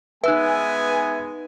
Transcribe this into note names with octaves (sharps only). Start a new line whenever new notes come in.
G#3 B3 D#4 B4 E5 G#5 E6 F#6